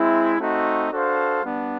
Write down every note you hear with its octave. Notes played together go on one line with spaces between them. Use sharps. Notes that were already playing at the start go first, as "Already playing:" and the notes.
Already playing: G#3 C4 E4
A3 C4 D#4 F#4
D4 F#4 A4 C5 F5
G3 B3 D4